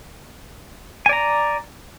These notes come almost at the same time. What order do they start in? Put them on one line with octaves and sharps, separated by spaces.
G#5 D5 A#5